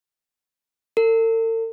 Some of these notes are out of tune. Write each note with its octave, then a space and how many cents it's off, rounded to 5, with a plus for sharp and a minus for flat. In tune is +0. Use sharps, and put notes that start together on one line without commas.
A4 +45